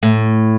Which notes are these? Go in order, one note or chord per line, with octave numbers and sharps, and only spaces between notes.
A2